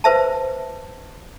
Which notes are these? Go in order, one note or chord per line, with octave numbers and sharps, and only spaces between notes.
B4 C5 E5 A5